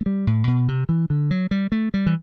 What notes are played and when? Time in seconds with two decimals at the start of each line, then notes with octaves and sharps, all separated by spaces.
0.01 A3
0.06 G3
0.27 A2
0.47 B2
0.68 C3
0.89 E3
1.10 D3
1.31 F#3
1.51 G3
1.72 A3
1.94 G3
2.06 E3